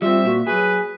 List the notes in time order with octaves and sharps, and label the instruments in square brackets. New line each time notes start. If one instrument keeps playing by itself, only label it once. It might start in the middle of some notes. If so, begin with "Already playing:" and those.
[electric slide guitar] G3 C4 [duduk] F4 [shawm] E5
[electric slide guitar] A#2 [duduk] F#4
[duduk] F#3 [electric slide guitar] G#4 [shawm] B4